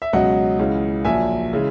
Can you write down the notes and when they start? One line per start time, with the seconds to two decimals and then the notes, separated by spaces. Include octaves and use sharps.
0.02 E5
0.13 C#2 B2 F#3 D#5 F#5
0.59 C#2 C#3 E3
1.05 A#1 A#2 F#3 E5 G#5
1.53 C#3 E3 G#3